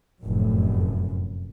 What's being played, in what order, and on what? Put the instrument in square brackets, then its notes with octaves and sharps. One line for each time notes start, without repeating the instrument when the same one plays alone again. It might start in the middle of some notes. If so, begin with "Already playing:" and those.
[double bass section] F1 F#2 A2